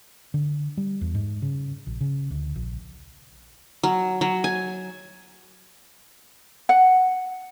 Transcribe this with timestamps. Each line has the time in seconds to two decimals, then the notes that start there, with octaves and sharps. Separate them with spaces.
0.34 D3
0.77 G3
1.01 E2
1.15 G#2
1.42 C#3
1.87 A#1
2.01 C#3
2.31 D2
2.56 A#1
3.83 F#3
4.21 F#3
4.44 G#5
6.69 F#5